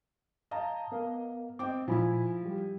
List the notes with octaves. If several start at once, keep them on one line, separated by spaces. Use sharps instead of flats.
D#5 F5 A5 A#5
B3 A#4 F5
C4 D#5 G5 D6
A#2 F3 E4 G#5 B5
G3 G4